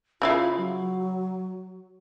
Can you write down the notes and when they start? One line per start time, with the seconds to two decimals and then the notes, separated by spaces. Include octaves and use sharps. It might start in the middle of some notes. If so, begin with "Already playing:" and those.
0.22 C#3 E4 F4 F5
0.57 F#3